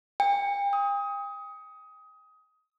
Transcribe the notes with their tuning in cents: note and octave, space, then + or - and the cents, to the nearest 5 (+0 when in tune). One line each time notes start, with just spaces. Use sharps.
G5 +45
D#6 +20